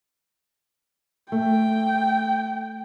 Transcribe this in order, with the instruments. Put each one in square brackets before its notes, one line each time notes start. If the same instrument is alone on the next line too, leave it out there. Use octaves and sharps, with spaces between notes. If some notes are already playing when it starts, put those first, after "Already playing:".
[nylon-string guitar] A3 [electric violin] G5